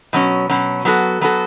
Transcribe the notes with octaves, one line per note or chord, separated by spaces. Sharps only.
B2 F#3 C#4
B2 F#3 C#4
F#3 B3 F#4 A4
F#3 B3 F#4 A4